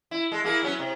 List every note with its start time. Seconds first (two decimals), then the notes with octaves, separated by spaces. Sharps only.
0.11 E4
0.32 G#3 A4
0.44 A#3 E4 G#4
0.63 F#3 B3 C#4
0.79 C3